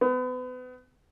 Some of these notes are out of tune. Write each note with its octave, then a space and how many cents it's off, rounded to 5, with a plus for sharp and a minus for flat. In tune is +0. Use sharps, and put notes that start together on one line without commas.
B3 +35